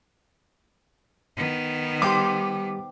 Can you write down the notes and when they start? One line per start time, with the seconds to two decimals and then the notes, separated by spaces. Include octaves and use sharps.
1.36 D#3 B3
2.02 G3 G4 C5 G5 C6 D6